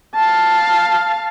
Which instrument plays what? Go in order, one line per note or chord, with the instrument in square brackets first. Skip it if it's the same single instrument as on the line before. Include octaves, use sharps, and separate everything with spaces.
[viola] F5 A5